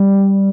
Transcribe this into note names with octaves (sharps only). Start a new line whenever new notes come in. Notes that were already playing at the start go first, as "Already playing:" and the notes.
Already playing: G3